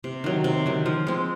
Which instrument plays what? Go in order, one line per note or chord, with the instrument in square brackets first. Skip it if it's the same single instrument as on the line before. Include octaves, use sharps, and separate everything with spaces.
[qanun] C3
D#3 F#3
C3
D#3 F#3
F3
G#3 C4